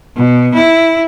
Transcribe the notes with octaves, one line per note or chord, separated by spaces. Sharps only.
B2
E4